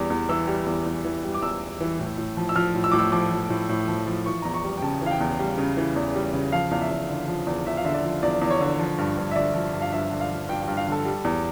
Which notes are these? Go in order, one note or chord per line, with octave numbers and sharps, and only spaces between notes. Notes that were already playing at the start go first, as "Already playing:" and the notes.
Already playing: E2 G3
E2
E3 E6
G3
E2
E2
E3
G3
D6
E2 E6
E2
E3
A2
A2
F3
E6
F3 F6
A2
E6
A2 D6
E6
F3 D6
F3
A2
A2
F3
F3
E3 C#6
E2 A#5
C#6
G3
G5
C#3 A5
E3
F5
G5
E2
G3
C#3
E3
E2
G3
C#3
F3 F5
E2 F5
E5
E2
D3
F3
E2
E2 E5
F5
D3 E5
D5
F3
E2 D5
E2
C#5
D3
F3
G2
G2
E5
D3 D5
F3
G2
F5
G2 E5
D3
F5
F3
G2 G5
G2 G5
F5
D3 A4
G3
E2